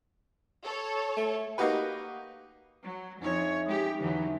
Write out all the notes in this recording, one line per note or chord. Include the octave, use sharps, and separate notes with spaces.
A4 C#5
A3
A#3 D#4 F#4 G4 B4
F#3
F2 C#4 D#4 E4 C#5
G#3 G4 B5 D#6
E2 D3 E3 F#3